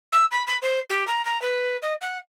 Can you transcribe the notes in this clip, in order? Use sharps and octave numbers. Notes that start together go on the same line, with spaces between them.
E6
B5
B5
C5
G4
A#5
A#5
B4
D#5
F#5